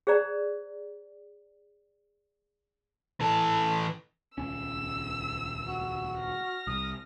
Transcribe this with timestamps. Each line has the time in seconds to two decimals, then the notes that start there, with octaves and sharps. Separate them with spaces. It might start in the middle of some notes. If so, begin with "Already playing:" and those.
0.07 G#4 C5 D5 A#5
3.20 E3 A4
4.38 D#1 C#2 C#4 E6
5.68 F#4
6.18 F6 A#6
6.67 C2 D#6